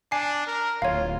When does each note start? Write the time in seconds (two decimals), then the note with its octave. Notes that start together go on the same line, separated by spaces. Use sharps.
0.12 D4 G#5 C7
0.47 A#4
0.82 D1 F4 C#5 F5